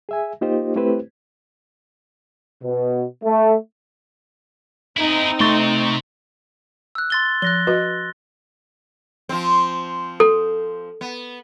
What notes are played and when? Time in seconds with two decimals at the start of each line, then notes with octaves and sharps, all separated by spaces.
0.09 G#4 E5 G#5
0.41 A#3 D#4 F4 G4 C5 D#5
0.76 A3 C4 E4 G4 B4 C5
2.63 B2
3.24 A3
4.97 C4 D#4 E4 G#4
5.40 C3 A3 C6 C#6 A6
6.95 E6 F#6
7.10 C6 A6 G7
7.42 F3 F#6 A#6 G7
7.67 F#4 B4 D#5
9.29 F3 C4
10.20 A4
11.01 B3